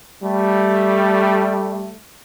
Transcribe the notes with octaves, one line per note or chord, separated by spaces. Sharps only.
G3 A3